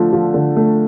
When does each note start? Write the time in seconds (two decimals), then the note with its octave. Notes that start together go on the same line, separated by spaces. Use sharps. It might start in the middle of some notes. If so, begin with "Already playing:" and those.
Already playing: D3 F3 A3
0.13 F3
0.34 D3
0.56 A3